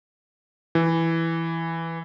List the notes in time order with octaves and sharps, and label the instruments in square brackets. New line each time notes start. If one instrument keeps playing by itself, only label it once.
[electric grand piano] E3